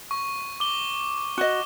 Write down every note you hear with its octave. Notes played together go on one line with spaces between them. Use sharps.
C#6
D6 G7
F#4 D#5